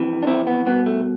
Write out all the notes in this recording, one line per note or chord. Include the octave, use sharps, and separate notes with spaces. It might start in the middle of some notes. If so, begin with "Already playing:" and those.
Already playing: F2 C3 E3
D4
C4 E4
B3
C2 B2 B3
A3